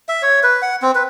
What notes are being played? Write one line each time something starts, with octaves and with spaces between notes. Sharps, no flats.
E5
C#5
B4
F#5
C4
B4